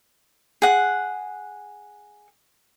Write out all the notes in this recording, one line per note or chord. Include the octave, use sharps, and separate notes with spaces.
G#4 F#5